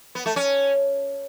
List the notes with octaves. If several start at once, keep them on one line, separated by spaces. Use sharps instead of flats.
B3
A3
C#4